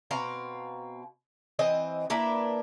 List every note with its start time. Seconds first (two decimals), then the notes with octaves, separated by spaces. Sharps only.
0.11 B2 C4 F5 A#5
1.59 E3 C4 D#5
2.10 A#3 D4 E4 B4